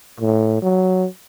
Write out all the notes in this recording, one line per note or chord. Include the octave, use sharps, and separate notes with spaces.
A2
F#3